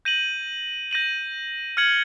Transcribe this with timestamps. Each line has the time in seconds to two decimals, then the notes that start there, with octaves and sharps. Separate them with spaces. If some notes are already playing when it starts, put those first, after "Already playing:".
0.05 G6 A#6 D#7 F#7
0.91 G6 A#6 D#7 F#7
1.77 F6 G#6 C#7 F#7